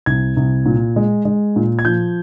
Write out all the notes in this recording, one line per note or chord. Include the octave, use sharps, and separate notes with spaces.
C2 G#6
C2
A#2
G#3
G#3
A#2
G#6
F3 G6